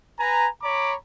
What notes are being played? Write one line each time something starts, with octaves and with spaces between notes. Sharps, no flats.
B4 G#5 A#5
C#5 A#5 B5 D6